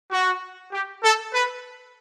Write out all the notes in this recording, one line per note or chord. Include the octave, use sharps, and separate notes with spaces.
F#4
G4
A4
B4